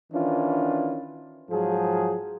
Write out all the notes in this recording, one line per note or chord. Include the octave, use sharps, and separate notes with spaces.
D#3 E3 C#4 D4 F4
G#2 F3 F#3 G#4